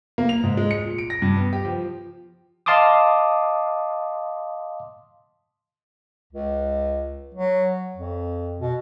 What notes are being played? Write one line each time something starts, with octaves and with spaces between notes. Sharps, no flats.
A#3
F7
G#2
G#3
C#7
A#2
D7
A#6
G2
B3
G4
F3
D#5 F5 A5 C6 D6 D#6
C#2
F#3
F2
B2